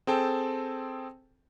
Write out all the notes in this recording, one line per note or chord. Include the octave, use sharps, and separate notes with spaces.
C4 G#4 A4 G5 A5